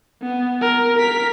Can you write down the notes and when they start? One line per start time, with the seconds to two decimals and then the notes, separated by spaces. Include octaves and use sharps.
0.22 B3
0.61 A#4
0.98 A#4 B6